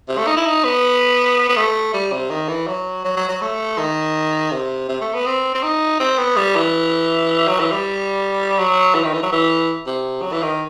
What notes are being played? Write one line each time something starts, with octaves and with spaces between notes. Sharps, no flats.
C3
A3
D#4
E4
D#4
B3
B3
A3
G3
C3
D#3
E3
F#3
F#3
F#3
F#3
A3
D#3
C3
C3
A3
B3
C4
C4
D#4
C4
B3
G3
E3
F#3
E3
G3
F#3
E3
D#3
E3
F#3
E3
C3
F#3
E3
D#3